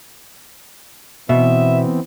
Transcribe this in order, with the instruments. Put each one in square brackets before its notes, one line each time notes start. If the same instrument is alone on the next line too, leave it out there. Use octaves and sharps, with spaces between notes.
[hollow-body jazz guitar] B2 [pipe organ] E3 B3 C4 [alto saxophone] E5